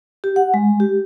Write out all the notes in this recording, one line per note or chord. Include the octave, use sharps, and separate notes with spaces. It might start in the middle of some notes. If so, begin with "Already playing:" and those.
G4
F#5
G#3
G4